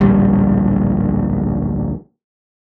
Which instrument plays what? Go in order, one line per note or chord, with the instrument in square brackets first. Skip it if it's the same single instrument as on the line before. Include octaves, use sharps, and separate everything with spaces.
[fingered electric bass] D1 A#1 G3